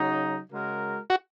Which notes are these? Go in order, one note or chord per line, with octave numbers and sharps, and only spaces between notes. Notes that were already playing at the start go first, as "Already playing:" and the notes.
Already playing: C#3 F#3 D#4
C#3 G#3 F#4 A#4
F#4